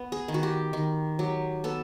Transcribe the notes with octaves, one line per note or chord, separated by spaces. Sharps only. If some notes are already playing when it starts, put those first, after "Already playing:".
Already playing: B3
G#4
D#3
F#4
G4
D#3
F#3 G4
B3 A4